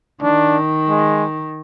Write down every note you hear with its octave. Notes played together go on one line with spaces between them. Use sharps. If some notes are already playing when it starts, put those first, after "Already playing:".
D#3 D4
G#3